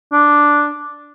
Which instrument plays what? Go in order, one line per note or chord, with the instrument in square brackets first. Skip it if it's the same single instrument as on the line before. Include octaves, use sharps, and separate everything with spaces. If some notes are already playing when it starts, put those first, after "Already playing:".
[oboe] D4